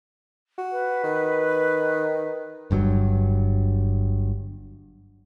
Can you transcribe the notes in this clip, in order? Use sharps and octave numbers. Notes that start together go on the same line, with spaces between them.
F#4
B4
D#3
G1 G2 B2 F#3